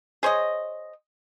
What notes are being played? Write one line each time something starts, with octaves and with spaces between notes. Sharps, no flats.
G#4 C5 C#5 D#5